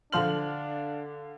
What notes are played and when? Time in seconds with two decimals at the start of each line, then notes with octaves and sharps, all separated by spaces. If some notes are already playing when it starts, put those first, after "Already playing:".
0.12 D3 F3 D4 C5 F5 F6 F#7